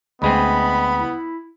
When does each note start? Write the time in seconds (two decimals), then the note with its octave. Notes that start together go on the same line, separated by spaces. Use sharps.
0.22 D2 G#3 B3 C4 D#5 B5
0.96 E4